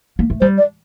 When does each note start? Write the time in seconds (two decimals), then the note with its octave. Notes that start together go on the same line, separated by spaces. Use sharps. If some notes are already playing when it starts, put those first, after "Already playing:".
0.19 A#3
0.30 A3
0.41 G3 C5
0.58 D5